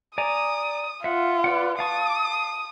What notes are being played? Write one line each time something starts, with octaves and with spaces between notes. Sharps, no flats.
D5 G#5 A#5 D#6
F4 E5 F#5
B4 D5 F#5
F5 A5 C#6 D#6